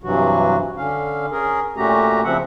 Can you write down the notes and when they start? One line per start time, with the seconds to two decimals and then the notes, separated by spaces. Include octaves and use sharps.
0.04 G2 C3 E3 F#3 F#4
0.77 D3 C#4 F5
1.32 C#4 G#4 A#4
1.77 A#2 A3 C#4 F#4 G4 A#5
2.24 C#3 F3 C4 E5 F#5